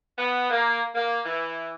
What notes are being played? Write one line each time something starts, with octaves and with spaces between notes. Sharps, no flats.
B3
A#3
A#3
E3